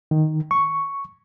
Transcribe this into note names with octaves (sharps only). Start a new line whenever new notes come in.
D#3
C#6